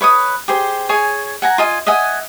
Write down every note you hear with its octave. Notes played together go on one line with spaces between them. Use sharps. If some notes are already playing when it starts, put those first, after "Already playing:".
B4 C#5 C#6 D#6
G4 G#4 C5
G#4 C#5 G#5
F#5 G#5 A#5
F4 D#5 G#5
D#5 E5 F#5 G#5